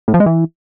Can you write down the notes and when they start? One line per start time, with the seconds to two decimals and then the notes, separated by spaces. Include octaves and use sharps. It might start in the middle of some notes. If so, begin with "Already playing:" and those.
0.08 A2
0.14 F3
0.20 G#3
0.26 E3